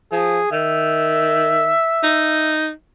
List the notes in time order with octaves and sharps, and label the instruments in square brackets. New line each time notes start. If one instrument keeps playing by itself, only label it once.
[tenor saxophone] F3 [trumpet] G#4
[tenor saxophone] D#3 [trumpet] E5
[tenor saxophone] D#4